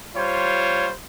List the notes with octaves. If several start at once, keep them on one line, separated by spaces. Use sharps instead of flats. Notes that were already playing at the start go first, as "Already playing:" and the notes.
G3 F4 C5 C#5